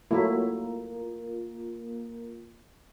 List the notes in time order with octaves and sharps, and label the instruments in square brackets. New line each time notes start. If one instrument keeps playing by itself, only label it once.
[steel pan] F#3 A3 E4 [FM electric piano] A#3 F4 A#4